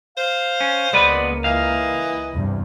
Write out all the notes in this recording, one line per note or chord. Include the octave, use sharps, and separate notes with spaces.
C5 F5
C#4
C#2 G#3 A#3 B3 B4 D5
E3 D#5 F5
E2 G2 C3